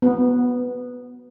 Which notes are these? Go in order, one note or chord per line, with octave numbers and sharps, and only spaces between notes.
B3